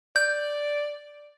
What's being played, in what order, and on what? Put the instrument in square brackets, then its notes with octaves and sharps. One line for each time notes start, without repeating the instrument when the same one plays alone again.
[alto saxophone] D5 [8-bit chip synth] G6